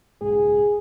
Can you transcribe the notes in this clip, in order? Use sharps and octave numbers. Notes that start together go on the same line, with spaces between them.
F#1 B1 G#2 G#4